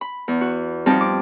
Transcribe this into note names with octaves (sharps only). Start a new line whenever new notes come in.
B5
E2
F#4
F2 G3 C4 D#4 A5
D6